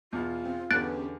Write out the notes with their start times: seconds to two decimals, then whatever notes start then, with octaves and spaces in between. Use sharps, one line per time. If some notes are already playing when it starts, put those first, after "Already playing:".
0.13 E2 B2 F4
0.45 C4
0.71 E2 D3 B3 C#4 G4 F#6 A6 D7